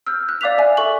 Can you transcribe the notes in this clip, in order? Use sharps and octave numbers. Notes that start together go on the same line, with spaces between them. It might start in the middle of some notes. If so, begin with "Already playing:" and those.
E6 F6 G6
F#6
D5 F5 D6 F#6 B6 F7
E5 G#5
A4 C#6 F#7